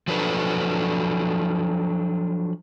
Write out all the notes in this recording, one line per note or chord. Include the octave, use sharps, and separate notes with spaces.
F3 F#3 D4 A4 B4